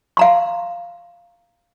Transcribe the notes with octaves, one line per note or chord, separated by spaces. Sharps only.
F5 A#5 C6